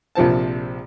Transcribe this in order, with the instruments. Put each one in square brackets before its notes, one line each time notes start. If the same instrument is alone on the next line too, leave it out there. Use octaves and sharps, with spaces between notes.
[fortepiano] A#1 C3 F3 C4 A5